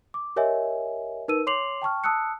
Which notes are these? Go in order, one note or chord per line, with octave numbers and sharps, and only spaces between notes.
D6
G4 A#4 C#5 D#5 E5 G#5
D#4 A#4 B4 E6 D#7
C#5 C6 D6 C7 F7 F#7
G5 A5 C#6 F6
A5 D#6 E6 F#6 C#7